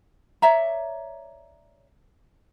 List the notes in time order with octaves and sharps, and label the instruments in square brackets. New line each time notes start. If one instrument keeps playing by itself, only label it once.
[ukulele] C#5 D5 E5 A#5